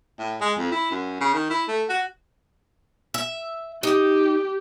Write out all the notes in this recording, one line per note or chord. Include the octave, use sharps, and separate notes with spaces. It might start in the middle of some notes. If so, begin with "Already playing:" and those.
A2
G#3
F2
E4
F#2
C#3
D#3
E4
A3
F#4
E5
D#4 G4